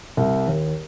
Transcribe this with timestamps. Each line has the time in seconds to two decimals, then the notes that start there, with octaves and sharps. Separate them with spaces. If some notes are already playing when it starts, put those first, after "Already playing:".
0.17 C2
0.47 D#2